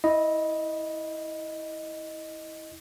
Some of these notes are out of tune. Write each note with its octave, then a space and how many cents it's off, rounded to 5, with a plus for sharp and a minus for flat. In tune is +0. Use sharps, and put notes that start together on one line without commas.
E4 -20 D#5 +0